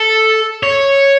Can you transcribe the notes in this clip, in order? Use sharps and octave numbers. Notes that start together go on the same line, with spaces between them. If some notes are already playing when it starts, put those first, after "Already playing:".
Already playing: A4
C#5